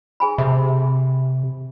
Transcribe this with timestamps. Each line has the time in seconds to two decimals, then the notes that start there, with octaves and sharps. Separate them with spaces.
0.20 G#4 G#5 B5
0.38 C3 A4 E5